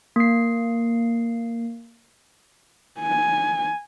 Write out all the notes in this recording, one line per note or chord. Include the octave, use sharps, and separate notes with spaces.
A#3 C7
G#5